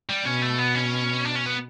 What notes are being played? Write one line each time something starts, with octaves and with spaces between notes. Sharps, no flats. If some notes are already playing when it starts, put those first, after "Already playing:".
G3
B2 C#4
A3
B3
C#4
D4
C#4
B3